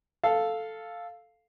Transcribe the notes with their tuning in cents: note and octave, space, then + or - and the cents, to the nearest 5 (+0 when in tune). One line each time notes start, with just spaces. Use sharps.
A4 +0 F5 +0